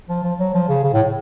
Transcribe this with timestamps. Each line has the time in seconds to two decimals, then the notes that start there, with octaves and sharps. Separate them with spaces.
0.09 F3
0.24 F3
0.39 F#3
0.54 F3
0.69 C#3
0.84 C#3
0.94 A2